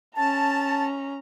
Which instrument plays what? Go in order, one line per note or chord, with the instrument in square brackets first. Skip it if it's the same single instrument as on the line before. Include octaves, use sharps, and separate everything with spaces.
[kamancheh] C#4 A#5 [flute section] A5